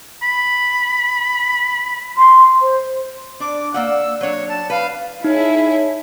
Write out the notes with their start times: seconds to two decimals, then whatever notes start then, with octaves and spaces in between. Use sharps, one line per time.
0.23 B5
2.17 C6
2.61 C5
3.40 D4 D6
3.74 A#3 D5 F#5 E6
4.21 F#3 D4 C#5
4.48 A5
4.70 B4 F5
5.24 D#4 E4 G#4 C#5 A5